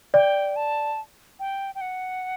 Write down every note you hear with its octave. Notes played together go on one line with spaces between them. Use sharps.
D5 G5
A5
G5
G5
F#5